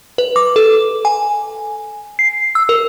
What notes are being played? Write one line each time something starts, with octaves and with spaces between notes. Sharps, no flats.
B4
D6
A4
G#5
C7
E6
A#4